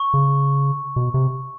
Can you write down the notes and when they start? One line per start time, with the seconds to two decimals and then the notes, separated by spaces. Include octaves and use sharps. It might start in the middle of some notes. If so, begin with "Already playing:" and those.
Already playing: C#6
0.14 C#3
0.96 B2
1.14 C3